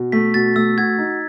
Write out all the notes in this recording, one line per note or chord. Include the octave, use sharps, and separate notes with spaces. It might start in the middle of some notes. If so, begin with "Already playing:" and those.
Already playing: B2
A3 B6
B2 A6
A3 E6
F#4 G#6
D#4